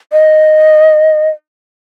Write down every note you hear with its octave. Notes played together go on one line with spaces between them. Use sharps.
D#5